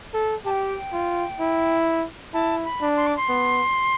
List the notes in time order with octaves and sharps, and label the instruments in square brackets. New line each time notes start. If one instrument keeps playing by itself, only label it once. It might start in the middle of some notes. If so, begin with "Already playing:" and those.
[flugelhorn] A4
[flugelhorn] G4 [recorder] A5
[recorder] G5
[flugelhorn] F4
E4
[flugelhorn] E4 [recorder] A5
[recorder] B5
[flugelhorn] D4
[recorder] C6
D6
C6
[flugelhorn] B3